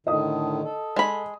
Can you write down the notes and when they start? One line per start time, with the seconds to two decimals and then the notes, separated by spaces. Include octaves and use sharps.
0.07 A2 D3 D#3 D#5 D#6
0.63 A4
0.96 G#3 B5